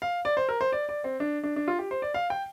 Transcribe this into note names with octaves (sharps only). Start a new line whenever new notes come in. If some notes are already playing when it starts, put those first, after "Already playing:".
F5
D5
C5
A#4
C5
D5
D5
C4
D4
D4
D4
F4
G4
C5
D5
F5
G5